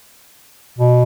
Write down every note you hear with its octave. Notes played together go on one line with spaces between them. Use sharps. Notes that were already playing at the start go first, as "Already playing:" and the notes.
B2